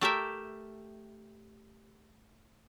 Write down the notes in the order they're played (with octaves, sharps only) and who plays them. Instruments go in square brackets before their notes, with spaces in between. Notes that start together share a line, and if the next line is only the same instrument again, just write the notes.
[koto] A3 G4 A#4 E5